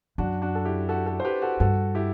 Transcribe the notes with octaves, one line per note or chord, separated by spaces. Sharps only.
F#2 D4 F#4
D4 F#4
A4
E4 G4
F#4 A4
F#4 A4
C5
G4 B4
F#4 A4
G2 F#4 A4
E4 G4